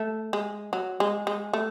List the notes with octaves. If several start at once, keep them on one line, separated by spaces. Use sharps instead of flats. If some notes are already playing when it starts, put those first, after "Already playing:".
Already playing: A3
G#3
F#3
G#3
G#3
A3